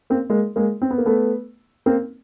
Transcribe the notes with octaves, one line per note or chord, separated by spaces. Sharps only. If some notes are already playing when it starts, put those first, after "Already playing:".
A#3 C4
G#3 A#3
G#3 A#3
C4
B3
A#3
A3 B3
A#3 C4